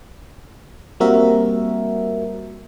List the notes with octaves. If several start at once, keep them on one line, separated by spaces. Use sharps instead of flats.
G3 A#3 C4 F#4 A#4 E5